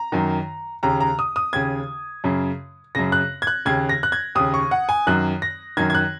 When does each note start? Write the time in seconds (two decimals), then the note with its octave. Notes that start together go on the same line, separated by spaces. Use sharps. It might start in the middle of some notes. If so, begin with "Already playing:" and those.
Already playing: A#5
0.12 F#2 D#3
0.83 D#2 C#3 A#5
1.00 A#5
1.19 D#6
1.36 D#6
1.53 D#2 C#3 G#6
2.24 F#2 C#3
2.95 F#2 C#3 A#6
3.12 F#6
3.42 G#6
3.47 F#6
3.66 D#2 C#3 G#6
3.89 A#6
4.03 F#6
4.12 G#6
4.35 D#2 C#3 D#6
4.54 C#6
4.71 F#5
4.89 G#5
5.07 F#2 D#3 F#6
5.42 A#6
5.77 F#2 D#3 G#6
5.90 G#6
5.95 F#6